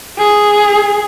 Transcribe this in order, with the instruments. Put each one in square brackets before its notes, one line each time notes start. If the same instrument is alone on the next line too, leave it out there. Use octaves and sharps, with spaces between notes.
[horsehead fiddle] G#4